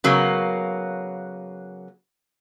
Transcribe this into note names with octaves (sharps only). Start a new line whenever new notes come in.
C#3 F#3 A#3 B3